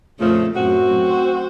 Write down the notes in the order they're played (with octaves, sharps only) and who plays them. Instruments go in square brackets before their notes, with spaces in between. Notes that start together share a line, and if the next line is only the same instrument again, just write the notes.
[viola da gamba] F2 A3 [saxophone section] A#2 C#3 F3
[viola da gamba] F#2 A2 [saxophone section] C4 F#4
[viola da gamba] C5